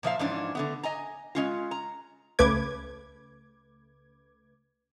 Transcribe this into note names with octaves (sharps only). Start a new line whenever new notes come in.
A#2 F3 E5 F5
G#2 E3 F3 C#4 D4
D3 A3 B3
D#5 G#5 A#5
G#3 C#4 F4
A#5
C#2 C#3 A3 B4 D6 G#6